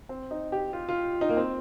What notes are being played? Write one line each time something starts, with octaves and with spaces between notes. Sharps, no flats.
C4
D#4
G4
F4
F4
D#4
A#3
C4